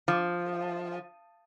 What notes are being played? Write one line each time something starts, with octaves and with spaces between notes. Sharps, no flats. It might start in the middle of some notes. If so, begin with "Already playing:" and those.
F3